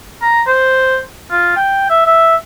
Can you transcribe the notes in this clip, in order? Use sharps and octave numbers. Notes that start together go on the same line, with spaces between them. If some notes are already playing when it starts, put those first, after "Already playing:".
A#5
C5
F4
G5
E5
E5